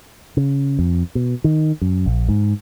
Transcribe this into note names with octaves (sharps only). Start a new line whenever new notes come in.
C#3
F2
B2
D#3
F#2
A#1
G#2